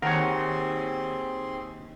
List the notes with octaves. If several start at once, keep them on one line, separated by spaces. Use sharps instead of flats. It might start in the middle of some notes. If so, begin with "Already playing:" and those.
D#2 C4 G#4 A#4 C#5 F#5 C6